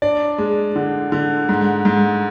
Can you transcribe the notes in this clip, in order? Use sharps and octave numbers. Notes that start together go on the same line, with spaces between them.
D4 D5
G#3
D3
D3
G#2
G#2